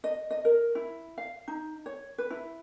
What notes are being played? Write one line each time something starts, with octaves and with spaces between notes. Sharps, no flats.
D#5
D#5
A#4
E4
F5
D#4
C#5
B4
E4